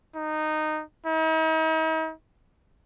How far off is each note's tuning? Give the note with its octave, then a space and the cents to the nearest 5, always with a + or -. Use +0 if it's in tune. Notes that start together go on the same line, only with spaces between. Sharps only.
D#4 -15
D#4 +45